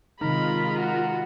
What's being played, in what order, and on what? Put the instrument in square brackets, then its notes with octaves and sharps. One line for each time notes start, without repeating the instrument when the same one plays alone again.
[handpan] C3 D#3 D#4 [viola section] G#3 F4 [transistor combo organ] A#4 [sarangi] B5
[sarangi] F#4